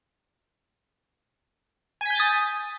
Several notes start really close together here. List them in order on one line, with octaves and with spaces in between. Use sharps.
G#5 B6 G6 A6 D#6